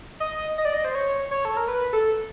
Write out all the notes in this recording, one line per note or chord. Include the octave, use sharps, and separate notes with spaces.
D#5
D#5
D5
D#5
C5
C#5
C#5
A4
A#4
B4
A4